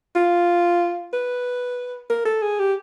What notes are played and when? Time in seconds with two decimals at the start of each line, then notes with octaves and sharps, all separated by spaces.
0.15 F4
1.13 B4
2.10 A#4
2.25 A4
2.42 G#4
2.59 G4